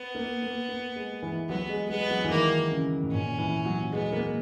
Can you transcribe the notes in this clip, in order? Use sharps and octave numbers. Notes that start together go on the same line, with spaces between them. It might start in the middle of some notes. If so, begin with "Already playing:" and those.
Already playing: B3
A#3
A#3
A#3
G#3
E3
F#3 B3
G#3
G#3 B3
F#3
E3
D#3 A#3
C#3
G#2
A#2 C#4
E3
F#3
G#3 B3
A#3